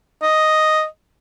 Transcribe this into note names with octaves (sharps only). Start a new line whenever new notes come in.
D#5